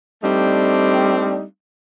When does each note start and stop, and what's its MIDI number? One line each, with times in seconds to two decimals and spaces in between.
0.23 1.43 55
0.23 1.43 57
0.23 1.43 60
0.23 1.43 62
0.23 1.43 63